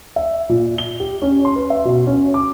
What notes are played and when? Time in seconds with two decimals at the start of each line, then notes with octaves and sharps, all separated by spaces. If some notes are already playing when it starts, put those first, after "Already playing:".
0.16 E5
0.49 A#2
0.78 G7
1.00 G4
1.22 C#4
1.45 C6
1.56 B4
1.70 E5
1.85 B2
2.07 C#4
2.34 D6